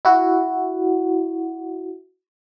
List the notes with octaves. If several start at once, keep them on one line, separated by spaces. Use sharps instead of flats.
E4 F#4